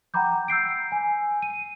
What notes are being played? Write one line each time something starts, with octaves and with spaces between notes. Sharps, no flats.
F#5 G5 A#5 B5 D6 G6
E6 G6 C7 D7
G#5
D#7